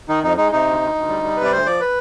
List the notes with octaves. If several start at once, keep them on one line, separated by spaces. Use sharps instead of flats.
D#3 D#4
F2 D#4
G#3 D#4
C3 D#4
D2
D2
D2
G3
G3
C3 B4
D5
D2 C5
F3 D5
B4